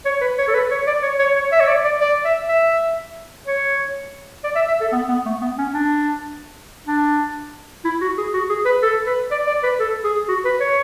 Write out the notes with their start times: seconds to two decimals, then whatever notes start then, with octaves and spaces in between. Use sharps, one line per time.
0.05 C#5
0.21 B4
0.38 C#5
0.48 A4
0.54 B4
0.71 C#5
0.87 D5
1.02 C#5
1.19 C#5
1.36 C#5
1.52 E5
1.60 C#5
1.68 D5
1.84 D5
2.00 D5
2.25 E5
2.49 E5
3.46 C#5
4.44 D5
4.55 E5
4.68 E5
4.81 A4
4.92 B3
5.09 B3
5.26 A3
5.41 B3
5.58 C#4
5.74 D4
6.87 D4
7.85 E4
8.01 F#4
8.18 G#4
8.33 F#4
8.49 G#4
8.66 B4
8.83 A4
9.06 B4
9.31 D5
9.47 D5
9.63 B4
9.79 A4
10.04 G#4
10.28 F#4
10.45 B4
10.60 C#5